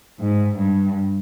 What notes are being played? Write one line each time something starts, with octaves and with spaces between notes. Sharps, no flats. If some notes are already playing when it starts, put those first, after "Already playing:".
G#2
G2